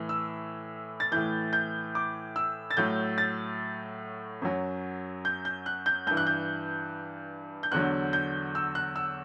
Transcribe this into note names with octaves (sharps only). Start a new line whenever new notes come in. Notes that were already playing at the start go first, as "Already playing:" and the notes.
Already playing: A2 E3
E6
A6
A2 E3 G6
G6
D6
E6
A6
A2 F#3 G6
A6
F#2 F#3
G6
G6
F#6
G6
G2 E3 G6
F#6
G6
G6
E2 D3 F#3 F#6
G6
E6
F#6
E6